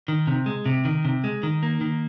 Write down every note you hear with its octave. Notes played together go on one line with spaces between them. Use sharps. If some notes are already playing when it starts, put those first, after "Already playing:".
D#3
C3
G#3
C3
D#3
C3
G#3
D#3
A#3
D#3